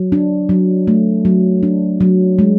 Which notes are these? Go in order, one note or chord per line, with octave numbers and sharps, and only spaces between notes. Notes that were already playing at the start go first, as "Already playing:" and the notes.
Already playing: F#3
D4
F#3
A3
F#3
D4
F#3
G#3